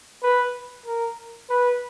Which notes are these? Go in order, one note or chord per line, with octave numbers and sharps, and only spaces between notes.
B4
A#4
B4